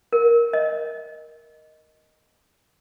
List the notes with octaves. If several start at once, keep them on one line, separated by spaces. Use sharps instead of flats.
A#4
D#5